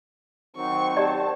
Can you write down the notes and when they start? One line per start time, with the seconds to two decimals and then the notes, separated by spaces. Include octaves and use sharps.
0.56 D#3 F#3 C4 C#6
0.97 G4 D5 A5